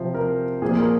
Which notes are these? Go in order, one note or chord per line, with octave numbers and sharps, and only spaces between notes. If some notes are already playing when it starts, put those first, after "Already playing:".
Already playing: C3 F3 C5
A#4
A#2 F3 G#4
A#4